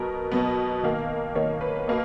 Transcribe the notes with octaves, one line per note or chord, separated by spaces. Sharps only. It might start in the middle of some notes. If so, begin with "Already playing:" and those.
Already playing: B2 F#3 B3 A#4
B2 F#3 B3
D#3 A#3
D#3 A#3 C#5
B4
B2 A#3